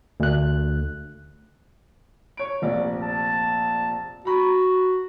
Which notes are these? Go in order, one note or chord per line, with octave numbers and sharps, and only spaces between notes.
D2 F#6
C#5 D7
F1 A#1 D5
A5
F#4 A#5 B5